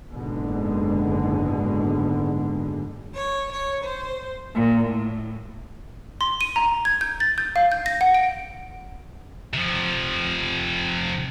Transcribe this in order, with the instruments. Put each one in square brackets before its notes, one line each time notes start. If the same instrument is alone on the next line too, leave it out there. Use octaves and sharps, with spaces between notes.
[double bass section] F#1 G#2 B2 D3 G#3
[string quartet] C#5
C#5
C5
A#2
A2
[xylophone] C6
D#7
A#5
G#6
G6
A6
G6
F5
G6
A#6
F#5
D7
[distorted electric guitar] C3 F3